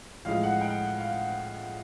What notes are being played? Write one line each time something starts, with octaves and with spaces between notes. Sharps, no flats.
A2 F3 G#3 F5
F#5
G5
F5